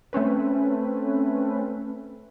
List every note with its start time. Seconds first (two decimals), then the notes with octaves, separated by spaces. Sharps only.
0.13 A3 C4 C#4 B4